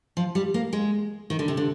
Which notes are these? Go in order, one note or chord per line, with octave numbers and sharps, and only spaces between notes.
F3
G3
A#3
G#3
D#3
D3
C3
D3